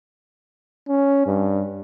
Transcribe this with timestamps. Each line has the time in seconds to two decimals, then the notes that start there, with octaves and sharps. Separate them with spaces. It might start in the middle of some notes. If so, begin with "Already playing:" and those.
0.88 C#4
1.26 G2